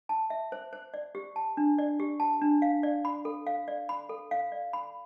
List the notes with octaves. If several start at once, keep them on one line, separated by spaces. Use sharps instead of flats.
A5
E5
C5
C5
D5
G4
A5
D4
D5
G4
A5
D4
F5
D5
B5
A4
F5
D5
B5
A4
F5
D5
B5